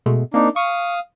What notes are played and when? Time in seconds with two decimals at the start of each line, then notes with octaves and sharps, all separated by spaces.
0.06 B2 G#3 A3
0.34 A#3 C4 D4 D#4
0.56 F5 C#6 D#6